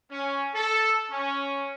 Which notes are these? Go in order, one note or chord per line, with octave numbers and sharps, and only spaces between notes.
C#4
A4
C#4